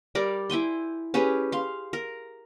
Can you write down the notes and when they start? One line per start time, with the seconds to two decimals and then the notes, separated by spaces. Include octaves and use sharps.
0.15 G3 A#4 D5
0.50 E4 G5 G#5 C6
1.14 C#4 G4 G#4 B4
1.52 F5 C6
1.93 A#4